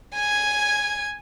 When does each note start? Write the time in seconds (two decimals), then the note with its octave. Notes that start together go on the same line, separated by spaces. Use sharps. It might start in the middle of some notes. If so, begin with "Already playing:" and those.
0.15 G#5 G#6